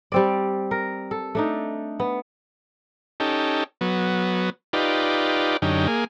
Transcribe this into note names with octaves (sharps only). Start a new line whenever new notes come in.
G3 C4 D5
A#4
A4
A3 D4 D#4
B3
C#4 D#4 G4 A4
F#3 B3
D#4 F4 G4 B4 D5
F#2 D3 C#4 D#4 G4
A#3 G#4